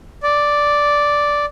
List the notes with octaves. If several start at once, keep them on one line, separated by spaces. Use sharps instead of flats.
D5